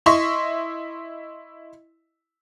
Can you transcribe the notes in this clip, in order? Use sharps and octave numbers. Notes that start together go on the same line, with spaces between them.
E4 D#5 E5 C6 C#6